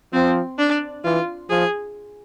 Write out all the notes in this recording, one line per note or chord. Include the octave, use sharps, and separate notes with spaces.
F3 C4
D4
E3 F4
F3 G#4